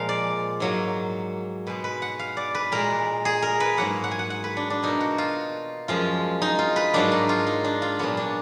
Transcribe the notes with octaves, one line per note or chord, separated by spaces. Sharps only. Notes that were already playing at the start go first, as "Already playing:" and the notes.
Already playing: A#2 F3 G#3 A#4 F5
D5
G#2 F#3 A#3
B2 G#3 B4
B4
F#5
F5
D5
B4
A#2 G#3 A#4
G#4
A#4
B4
G#2 F#3 A#3 F#5
F#5
G#5
F#5
F#5
B4
D4
D4
B2 A#3 D#4
F#4
F4
F#2 F3 G#3 F4
D#4
F4
B4
G#2 F#3 A#3 D4
D#4
F4
D#4
D4
F4
A#2 F#3 A#3 B3
D4